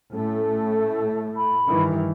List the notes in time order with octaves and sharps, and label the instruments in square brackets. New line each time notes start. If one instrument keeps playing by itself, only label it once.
[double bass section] A2 A3 [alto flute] C#4
[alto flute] B5
[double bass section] G2 D#3 E3